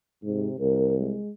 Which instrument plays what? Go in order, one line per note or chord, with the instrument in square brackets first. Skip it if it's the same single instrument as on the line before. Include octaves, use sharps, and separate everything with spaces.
[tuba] G#2 [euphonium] C3
[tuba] C2 [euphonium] A#4
[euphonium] G#3